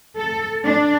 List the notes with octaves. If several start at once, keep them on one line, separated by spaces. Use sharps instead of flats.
A4
D4